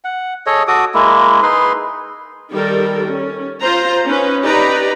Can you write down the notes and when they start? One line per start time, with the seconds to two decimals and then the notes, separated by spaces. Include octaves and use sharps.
0.04 F#5
0.46 G#4 A4 C#5 D#5
0.68 F#4 A4 D6 D#6
0.94 G#3 A#3 E4
1.43 D#4 G#4 B4 C6
2.52 D#3 G3 A4 A#4
3.10 C#4
3.59 F4 C5 A#5
4.06 C#4 D#4 B4
4.43 D#4 G4 B4 D5 A#5